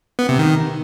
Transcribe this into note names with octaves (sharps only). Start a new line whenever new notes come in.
B3
C3
D#3